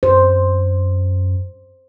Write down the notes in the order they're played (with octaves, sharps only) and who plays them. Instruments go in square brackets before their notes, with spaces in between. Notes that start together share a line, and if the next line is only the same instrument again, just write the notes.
[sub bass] F#2 [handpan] C5